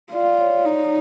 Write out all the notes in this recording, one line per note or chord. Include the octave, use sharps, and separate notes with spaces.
F4 D5
C#5
D#4